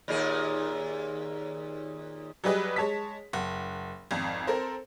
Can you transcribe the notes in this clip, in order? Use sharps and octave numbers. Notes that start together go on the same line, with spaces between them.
D#2 A#2 G#4
F#3 G3 G4 G#4 B4 D#5
G#3 C#5 A5 B6
F#1 F#5
G#1 F2
C4 A4 A#4 C5